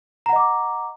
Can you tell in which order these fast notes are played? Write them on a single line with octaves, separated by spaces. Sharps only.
A#5 F#5 D#5 D6